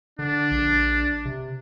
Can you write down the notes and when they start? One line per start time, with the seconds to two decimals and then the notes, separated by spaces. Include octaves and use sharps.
0.19 D3 D4
0.51 A#1
1.25 C3